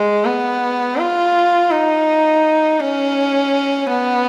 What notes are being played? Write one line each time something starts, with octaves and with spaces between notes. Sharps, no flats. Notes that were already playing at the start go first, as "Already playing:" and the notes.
Already playing: G#3
B3
F4
D#4
C#4
B3